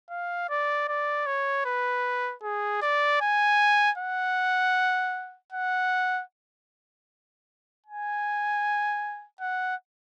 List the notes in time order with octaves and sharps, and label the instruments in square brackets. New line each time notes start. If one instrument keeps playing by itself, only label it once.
[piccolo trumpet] F5
D5
D5
C#5
B4
G#4
D5
G#5
F#5
F#5
G#5
F#5